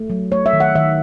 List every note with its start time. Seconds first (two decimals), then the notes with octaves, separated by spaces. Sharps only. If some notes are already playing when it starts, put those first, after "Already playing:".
Already playing: A3
0.10 F#3
0.32 A3 C#5
0.46 E5
0.53 D#3
0.60 F#5
0.75 D#3 E5